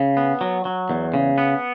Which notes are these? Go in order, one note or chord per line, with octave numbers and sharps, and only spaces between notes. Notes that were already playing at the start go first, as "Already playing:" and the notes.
Already playing: C#3
B3
F#3
F#3
E2
C#3
B3